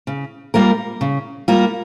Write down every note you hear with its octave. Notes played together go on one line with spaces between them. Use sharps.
C#3
G3 A#3 F4 A#4
C#3
G3 A#3 F4 A#4